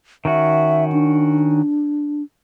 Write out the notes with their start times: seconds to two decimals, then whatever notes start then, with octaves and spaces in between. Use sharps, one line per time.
0.25 D#3 C#4 F#4 E5
0.92 D4